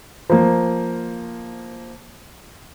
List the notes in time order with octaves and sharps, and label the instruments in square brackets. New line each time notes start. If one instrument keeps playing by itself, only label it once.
[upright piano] F3 A#3